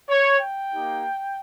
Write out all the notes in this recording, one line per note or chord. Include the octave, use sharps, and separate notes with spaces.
C#5
G5
A#3 D#4 G4